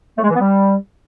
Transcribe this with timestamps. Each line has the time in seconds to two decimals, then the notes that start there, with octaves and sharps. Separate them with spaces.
0.18 A3
0.24 G#3
0.30 E3
0.35 B3
0.41 G3